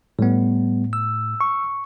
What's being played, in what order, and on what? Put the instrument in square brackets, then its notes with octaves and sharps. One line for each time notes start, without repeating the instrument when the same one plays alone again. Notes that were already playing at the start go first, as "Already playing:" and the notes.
[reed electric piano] A2 [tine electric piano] G3 B3
[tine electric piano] E6
[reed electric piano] C#6